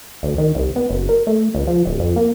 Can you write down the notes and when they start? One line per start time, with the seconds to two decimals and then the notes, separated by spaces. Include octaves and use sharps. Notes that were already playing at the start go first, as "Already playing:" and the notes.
0.23 D2
0.38 D#3
0.55 C2
0.76 B3
0.89 F#1
1.09 A#4
1.27 A3
1.55 C#2
1.67 F3
1.86 D1
2.00 F2
2.16 A#3